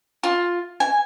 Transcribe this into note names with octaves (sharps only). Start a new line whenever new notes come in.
F4
G#5